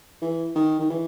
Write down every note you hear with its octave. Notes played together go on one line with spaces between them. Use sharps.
E3
D#3
D#3
E3